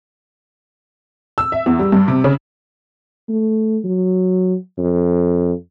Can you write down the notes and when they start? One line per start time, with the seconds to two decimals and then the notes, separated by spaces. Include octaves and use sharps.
1.38 E6
1.52 E5
1.66 E2
1.79 G3
1.92 G2
2.08 C3
2.24 C#3
3.29 A3
3.84 F#3
4.79 F2